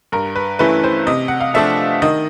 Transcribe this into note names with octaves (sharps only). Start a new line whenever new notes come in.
G2 A#4
B4
E3 A3 C#4 E4 B4
C5
C3 D#5
F#5
F5
F3 A3 D4 E5
D#3 D#5